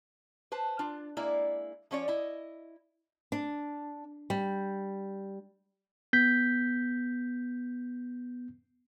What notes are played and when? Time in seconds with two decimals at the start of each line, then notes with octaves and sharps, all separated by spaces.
0.52 B4 C5 A5
0.79 D4 F4
1.17 G#3 A#3 E4 D5
1.91 F3 C#4 C#5 D5
2.08 E4 D#5
3.32 D4
4.30 G3
6.13 B3 G6 B6